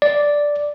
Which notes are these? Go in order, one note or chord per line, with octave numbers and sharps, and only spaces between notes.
D5